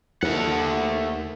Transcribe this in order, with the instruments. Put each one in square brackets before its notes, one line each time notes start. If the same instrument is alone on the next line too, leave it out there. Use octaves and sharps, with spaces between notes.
[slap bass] D#2 [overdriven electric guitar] A3 F#5